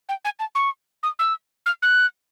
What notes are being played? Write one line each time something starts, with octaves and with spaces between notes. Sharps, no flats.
G5
G#5
A5
C#6
D#6
E6
F6
F#6